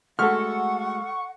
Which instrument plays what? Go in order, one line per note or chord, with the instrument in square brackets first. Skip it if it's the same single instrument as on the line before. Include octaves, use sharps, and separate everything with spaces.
[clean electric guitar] G#3 A3 F#4 [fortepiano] A4 F6 [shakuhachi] F#5 [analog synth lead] C#6